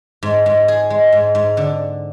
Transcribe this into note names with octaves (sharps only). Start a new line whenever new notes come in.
G#2
G#2
G#4
G#3
G#2
G#2
D3